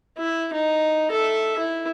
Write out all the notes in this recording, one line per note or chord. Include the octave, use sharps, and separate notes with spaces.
E4
D#4
A4 E5
E4